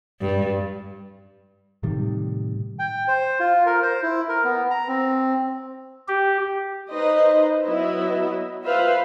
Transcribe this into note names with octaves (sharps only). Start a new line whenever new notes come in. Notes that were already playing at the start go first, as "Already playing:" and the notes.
G2
A2 C3 D#3 G3
G5
C5
F4
A#4
C5
E4
A#4
B3
A#5
C4
G4
D#4 B4 C5 D#5
F#3 B3 E4 D#5 E5
F4 B4 C5 E5 F5